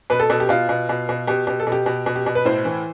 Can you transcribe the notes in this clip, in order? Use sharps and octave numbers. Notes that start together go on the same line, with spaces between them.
B2 B4
A4
B2 A4
G4
B2 F4
B2
B2
B2
B2 G4
B2 G4
A4
B2
G4
B2
B2
G4
B2
B4
A2 C5
E3